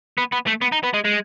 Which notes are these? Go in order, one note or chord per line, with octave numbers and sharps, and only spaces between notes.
B3
B3
A3
B3
D#4
B3
G#3
G#3